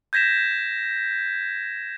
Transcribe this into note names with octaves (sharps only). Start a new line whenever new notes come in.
G6 G#6 A#6 B6 E7